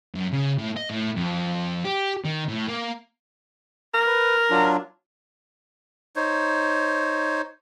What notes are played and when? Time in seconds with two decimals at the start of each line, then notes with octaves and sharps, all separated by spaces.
0.15 F#2
0.33 C#3
0.58 A2
0.77 D#5
0.90 A2
1.16 F2
1.85 G4
2.25 D#3
2.48 A2
2.68 A#3
3.94 A#4
4.06 B4
4.50 F#3 D4 F4
6.16 D#4 C5 C#5